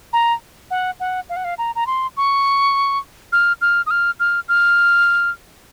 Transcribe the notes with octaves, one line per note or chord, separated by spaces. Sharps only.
A#5
F#5
F#5
F5
F#5
F5
A#5
A#5
C6
C#6
F6
F6
D#6
F6
F6
F6